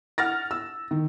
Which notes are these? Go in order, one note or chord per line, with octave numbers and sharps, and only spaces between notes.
F#5 F6 A6 A#6
E6
D#3